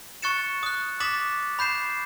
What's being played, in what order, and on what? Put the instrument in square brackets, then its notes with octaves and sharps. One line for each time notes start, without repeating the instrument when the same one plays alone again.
[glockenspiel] C#6 F#6 A6 C#7 E7
D#6 F#6
D6 D#6 A6 B6 E7 F#7
B5 G6 C7 E7